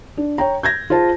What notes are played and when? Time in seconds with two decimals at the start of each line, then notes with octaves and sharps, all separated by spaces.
0.17 D4
0.38 C#5 G5 A#5
0.63 G6 G#6 A#6
0.90 F4 G#4 C5 A5